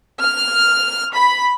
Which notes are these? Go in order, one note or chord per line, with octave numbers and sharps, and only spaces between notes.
F6
B5